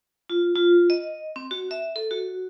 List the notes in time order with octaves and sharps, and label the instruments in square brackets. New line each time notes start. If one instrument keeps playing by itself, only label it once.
[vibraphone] F4
F4
D#5
C4
F#4
E5
A4
F#4